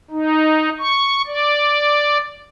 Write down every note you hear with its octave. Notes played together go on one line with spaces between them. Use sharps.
D#4
C#6
D5